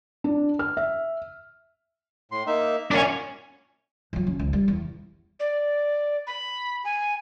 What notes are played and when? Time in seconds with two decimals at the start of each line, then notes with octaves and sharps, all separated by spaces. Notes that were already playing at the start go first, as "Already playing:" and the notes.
0.24 D4
0.59 F6
0.77 E5
2.32 A2 C6
2.47 A#3 D#4 E5
2.91 F#2 A#2 C#4 D4
4.13 F3 F#3
4.27 C#4
4.39 C#2
4.53 G3
4.68 E2
5.40 D5
6.27 B5
6.84 G#5